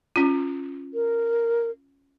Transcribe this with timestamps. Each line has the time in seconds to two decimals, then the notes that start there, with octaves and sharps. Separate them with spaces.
0.16 C#4 F4
0.94 A#4